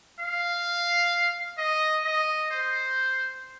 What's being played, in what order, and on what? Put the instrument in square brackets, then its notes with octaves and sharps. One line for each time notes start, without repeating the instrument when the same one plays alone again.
[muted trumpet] F5
D#5
D#5
C5